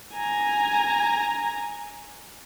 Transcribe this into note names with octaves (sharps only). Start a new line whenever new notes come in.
G#5 A#5